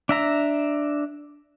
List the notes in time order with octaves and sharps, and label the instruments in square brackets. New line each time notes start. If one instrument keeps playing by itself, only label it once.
[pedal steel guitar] D4 E5 A#5